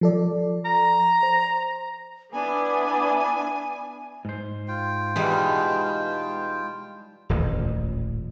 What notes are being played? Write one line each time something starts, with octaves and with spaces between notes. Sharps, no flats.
F3 A4 D5
A#5
C5
B3 D4 E4 G#5
G#2 C5
F4 G5
B2 E3 G3 G#3 D#4 G#4 B4
D#1 A1 F2